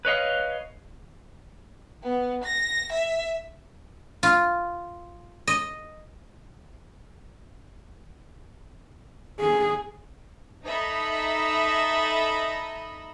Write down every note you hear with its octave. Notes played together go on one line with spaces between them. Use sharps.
B4 C#5 D#5 F5
B3
A#6
E5
F4
D#5
G#4
D#4 A4 D#5 E5 A#5 B5